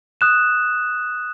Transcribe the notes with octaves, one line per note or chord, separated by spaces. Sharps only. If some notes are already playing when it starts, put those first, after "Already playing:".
D#6 F#6 E7